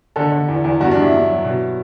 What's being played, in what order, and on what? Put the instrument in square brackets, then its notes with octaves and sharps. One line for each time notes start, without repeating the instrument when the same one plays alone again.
[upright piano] D3 A4
D3
E2
E2
G2 F#4
D4
G2
E4
G2
F#3
B2